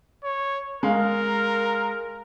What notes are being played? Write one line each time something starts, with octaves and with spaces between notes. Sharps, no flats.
C#5
G#3 A#4 F5